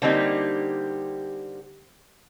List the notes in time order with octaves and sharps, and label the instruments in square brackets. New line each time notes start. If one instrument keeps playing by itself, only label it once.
[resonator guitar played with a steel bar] D3 G3 A#3 C4 D#4 G4